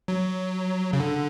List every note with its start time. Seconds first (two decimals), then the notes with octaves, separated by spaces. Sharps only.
0.08 F#3
0.93 C#3
1.00 D3